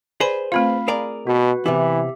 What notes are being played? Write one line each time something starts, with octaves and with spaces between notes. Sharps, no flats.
G#4 B4 C5 D5 B5
A3 C4 F4 F5 B5
G#4 A#4 D5
B2 F#4 B4
C3 E3 B3 E4 G4 E5